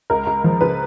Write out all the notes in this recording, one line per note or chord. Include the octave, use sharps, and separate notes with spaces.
C#2 A#4
C#2
F3
C#3 B4